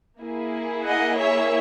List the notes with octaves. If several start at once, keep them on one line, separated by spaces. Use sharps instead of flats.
A#3 E4 G#4
D#5 F#5
C#5 E5